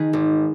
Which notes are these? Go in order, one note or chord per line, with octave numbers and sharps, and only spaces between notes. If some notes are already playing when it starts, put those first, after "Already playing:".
Already playing: D#3 G#4 B4
G#1